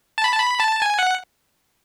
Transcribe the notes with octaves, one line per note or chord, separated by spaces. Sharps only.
A5
B5
A5
B5
A5
G#5
F#5